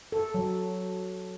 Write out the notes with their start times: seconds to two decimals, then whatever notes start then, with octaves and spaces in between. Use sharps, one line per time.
0.12 A4
0.34 F#3